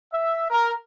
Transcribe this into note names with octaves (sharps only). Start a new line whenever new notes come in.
E5
A#4